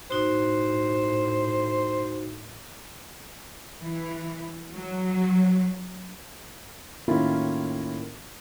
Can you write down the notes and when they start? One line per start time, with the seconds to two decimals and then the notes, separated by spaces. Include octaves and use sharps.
0.11 A2 D#4 F#4 C5
3.81 E3
4.71 F#3
7.08 A2 D#3 A#3 C#4 E4 F4